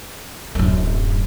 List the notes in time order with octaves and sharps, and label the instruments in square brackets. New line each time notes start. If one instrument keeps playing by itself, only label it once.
[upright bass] D1 F#2